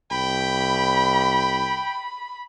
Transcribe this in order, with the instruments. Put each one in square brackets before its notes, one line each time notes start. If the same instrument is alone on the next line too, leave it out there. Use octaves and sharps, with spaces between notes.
[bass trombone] C2 [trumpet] G5 [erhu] B5